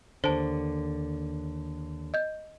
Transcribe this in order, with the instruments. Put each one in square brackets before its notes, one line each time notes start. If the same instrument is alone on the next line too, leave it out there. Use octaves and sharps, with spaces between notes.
[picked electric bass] D#2 D3 [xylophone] C5 A5
[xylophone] D#5 G6